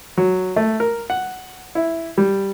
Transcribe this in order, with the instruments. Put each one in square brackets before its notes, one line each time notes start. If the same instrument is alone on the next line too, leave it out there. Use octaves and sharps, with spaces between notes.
[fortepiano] F#3
A3
A#4
F#5
E4
G3